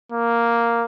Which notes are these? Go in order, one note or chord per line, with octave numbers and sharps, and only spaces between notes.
A#3